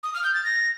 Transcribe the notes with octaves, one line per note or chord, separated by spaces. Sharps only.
D#6
F6
G6
A6
A#6